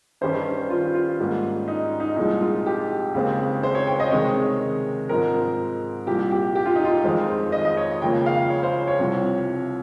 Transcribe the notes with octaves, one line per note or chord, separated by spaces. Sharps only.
G2 D#3 G3 C#4 C5
F4
F4
G#2 G3 A#3 C#4
D#4
D#4
C2 A#2 F3 G#3 D#4
F4
G4
D#2 C#3 G#3 C4
C5
C#5
G5
D#5
C3 D#3 G#3 C#5
G#2 F3 G#3 C4 A#4
C2 A#2 F3 G4
G4
G4
F4
D#4
F4
F2 D#3 G#3 C4
D#5
D#5
C#5
C#2 C#3 F3 A#3 C#4 G5
F5
C#5
C5
C#5
C2 C3 F3